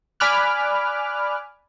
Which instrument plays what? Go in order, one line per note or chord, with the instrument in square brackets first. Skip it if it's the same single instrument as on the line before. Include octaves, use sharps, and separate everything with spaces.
[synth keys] D5 G#5 B5 D6 F6 F#6